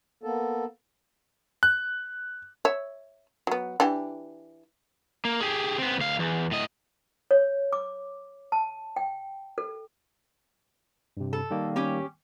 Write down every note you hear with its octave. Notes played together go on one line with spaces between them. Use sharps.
A#3 B3 A4
F#6
C#5 E5
F#3 B3
E3 D4 G4
A#3
G4 G#4
B3 C4
D2 F5
E2
A2 D#5
C#5
D6
A5
G5
A4
G2 C3
A4
D#3 G3 A#3
C#4 G4 C#5